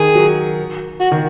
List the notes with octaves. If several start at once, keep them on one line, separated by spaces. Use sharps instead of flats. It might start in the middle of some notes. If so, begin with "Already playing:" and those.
Already playing: D#3 G#4
F#3
F#4
D#3